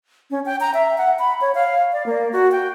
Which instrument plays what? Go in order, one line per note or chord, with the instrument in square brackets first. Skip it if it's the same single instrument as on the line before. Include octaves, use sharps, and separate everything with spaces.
[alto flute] C#4
G5
A#5
E5
F#5
B5
C#5
F5
D5
A#3
F#4
G5